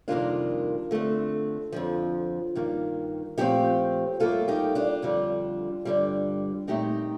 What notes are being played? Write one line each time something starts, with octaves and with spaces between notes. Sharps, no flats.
F2 C3 D#3 G3 A#3 D4 F4
D3 A3 C4
F2 D3 F3
G2 D#3 A#3
A#2 F3 A3 C4 D#4 G4
A2 G3 A#3 F4 A4
D#4 G4
D4 F4
F2 D3 G3
G2 D3 G3
A#2 A3 C4 D#4 G4